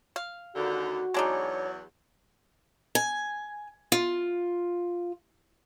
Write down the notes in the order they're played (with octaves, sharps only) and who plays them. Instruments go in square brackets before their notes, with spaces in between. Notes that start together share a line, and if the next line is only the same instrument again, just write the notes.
[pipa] F5
[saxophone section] D#2 D3 [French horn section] F#4
[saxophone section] E2 F#3 [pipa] G#3 D4 D#4 [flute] C#5
[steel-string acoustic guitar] G#5
F4